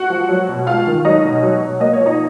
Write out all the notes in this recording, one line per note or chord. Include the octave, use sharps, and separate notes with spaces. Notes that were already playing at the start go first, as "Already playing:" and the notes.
Already playing: F#4 F#5
F3
F#3
B2
G#3 F4 F5
D#3
F#3 D#4 D#5
B2
F#3
B2
A#3 D#5
C#5
F3
D#4 D#5